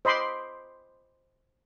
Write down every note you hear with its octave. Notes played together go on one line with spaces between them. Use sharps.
C5 D#5 B5 C6 D6